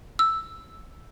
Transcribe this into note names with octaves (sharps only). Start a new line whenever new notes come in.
E6